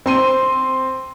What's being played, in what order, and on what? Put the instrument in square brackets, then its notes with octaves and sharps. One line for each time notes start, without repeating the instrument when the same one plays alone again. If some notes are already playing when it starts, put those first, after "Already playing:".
[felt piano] C4 C6 D#7